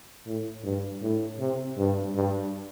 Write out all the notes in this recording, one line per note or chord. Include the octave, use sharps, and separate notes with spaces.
A2
G2
A2
C3
G2
G2